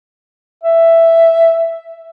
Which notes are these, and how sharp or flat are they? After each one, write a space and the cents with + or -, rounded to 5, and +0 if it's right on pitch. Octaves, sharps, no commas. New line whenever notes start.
E5 +5